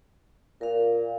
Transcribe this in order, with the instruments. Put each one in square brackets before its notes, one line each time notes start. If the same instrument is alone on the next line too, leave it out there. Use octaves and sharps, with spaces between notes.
[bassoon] A#2 [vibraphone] A#4 F5